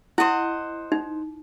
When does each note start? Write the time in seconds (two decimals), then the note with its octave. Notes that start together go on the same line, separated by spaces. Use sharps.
0.18 E4 C5 D#5 F#5
0.92 D#4